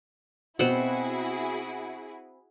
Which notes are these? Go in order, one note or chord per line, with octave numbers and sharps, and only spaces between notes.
B2 C4 E4 F#4 G#4 F#5